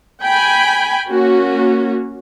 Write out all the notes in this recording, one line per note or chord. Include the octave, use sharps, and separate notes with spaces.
G5 G#5 B5
A#3 C#4 F#4